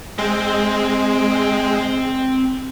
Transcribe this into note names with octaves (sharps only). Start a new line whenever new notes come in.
G#3 C4 C5